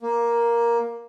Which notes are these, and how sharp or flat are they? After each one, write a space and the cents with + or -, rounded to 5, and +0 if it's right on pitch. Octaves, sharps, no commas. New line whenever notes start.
A#3 +10